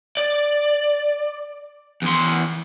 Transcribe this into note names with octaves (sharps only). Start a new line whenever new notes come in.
D5
E2 C6